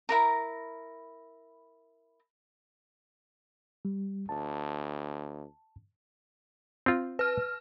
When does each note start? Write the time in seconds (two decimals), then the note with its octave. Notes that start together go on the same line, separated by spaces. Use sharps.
0.09 E4 A#4 A#5
3.85 G3
4.29 D2 A5
6.86 C4 F4
7.19 B4 F6